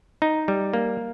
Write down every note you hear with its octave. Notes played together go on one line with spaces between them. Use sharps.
D#4
G3
A#3